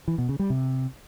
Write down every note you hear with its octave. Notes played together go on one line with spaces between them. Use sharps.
E3
B2
C#3
G3
C3